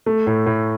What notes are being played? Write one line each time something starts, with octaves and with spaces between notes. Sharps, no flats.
A3
A2
A2